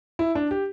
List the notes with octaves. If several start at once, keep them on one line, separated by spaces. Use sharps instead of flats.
E4
D4
G4